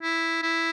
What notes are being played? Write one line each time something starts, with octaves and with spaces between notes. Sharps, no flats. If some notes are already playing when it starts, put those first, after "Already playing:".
E4
E4